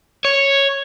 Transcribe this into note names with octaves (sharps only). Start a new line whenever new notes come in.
C#5